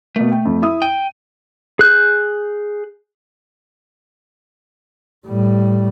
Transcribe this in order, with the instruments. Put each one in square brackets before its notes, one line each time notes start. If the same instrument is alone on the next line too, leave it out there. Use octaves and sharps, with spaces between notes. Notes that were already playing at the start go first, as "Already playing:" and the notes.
[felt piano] B2 A#3 [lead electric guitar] A3
[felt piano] G5
F2
E4 E5 D#6
[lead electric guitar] G5 [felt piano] D#7
[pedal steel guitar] G#4 F#6 G6
[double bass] A2 G3